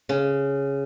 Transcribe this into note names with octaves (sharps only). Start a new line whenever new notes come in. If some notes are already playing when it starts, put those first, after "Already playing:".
C#3